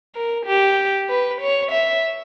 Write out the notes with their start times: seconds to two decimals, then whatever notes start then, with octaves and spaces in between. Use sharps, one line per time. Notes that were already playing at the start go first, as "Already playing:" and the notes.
0.16 A#4
0.46 G4
1.09 B4
1.41 C#5
1.72 E5